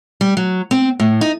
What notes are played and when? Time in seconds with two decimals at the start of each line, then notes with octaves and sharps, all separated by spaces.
0.21 G3
0.37 F#3
0.71 C4
1.00 A2
1.21 D#4